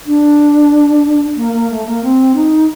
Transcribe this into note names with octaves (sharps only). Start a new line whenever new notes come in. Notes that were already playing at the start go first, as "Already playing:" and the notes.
D4
A#3
A#3
A3
A#3
C4
D#4